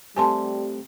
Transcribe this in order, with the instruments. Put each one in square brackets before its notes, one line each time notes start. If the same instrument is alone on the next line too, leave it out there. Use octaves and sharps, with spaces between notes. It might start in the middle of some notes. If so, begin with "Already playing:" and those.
[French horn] G3 [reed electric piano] A3 C4 G4 [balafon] G#5 A5 C6